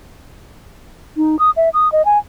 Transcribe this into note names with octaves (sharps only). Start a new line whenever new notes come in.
D#4
D#6
E5
D#6
D#5
G#5